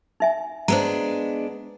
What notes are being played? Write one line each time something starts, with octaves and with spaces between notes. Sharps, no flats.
D#4 E5 G#5
G#3 B3 D4 C5 A#5